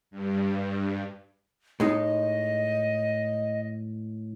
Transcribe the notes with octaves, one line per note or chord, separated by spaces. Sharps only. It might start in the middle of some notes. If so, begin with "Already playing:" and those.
G2
A2 G#3 D#4 D#5